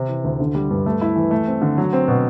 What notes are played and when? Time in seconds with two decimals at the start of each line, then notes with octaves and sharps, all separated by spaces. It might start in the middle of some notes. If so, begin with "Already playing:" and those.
Already playing: C3
0.08 E3
0.24 D2
0.40 D3
0.55 G3
0.71 G2
0.86 A3
1.01 E4
1.16 E3
1.31 A3
1.47 C4
1.62 D3
1.77 F#3
1.93 C4
2.08 B2